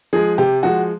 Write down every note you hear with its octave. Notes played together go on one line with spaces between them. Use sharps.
F3 G#3 G#4
C3 G4
F3 G#3 F#4